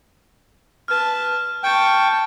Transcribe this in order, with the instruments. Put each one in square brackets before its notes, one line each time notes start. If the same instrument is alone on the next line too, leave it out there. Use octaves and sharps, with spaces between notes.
[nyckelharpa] B4 A5 [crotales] F6
[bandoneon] G5 [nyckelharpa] A5 C#6